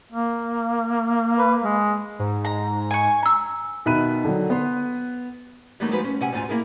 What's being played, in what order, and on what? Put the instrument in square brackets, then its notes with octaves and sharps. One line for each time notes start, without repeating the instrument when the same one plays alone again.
[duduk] A#3
[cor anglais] B4
G#3
[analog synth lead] G#2
[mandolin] A#5
G#5 C#6
[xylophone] A#5 E6
[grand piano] B2 D#3 E5 B5 F#6 D#7
D3 D#3 F#3
B3 B4 C6
[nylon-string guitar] E3 F#3 G3 A3 A#3 D#4
F3 G#3 D#4 F#4 B4
C#4
C3 C#4 G4 F#5 G#5
D2 G#2 F4 G#5
A#3 E4 G#4 A#4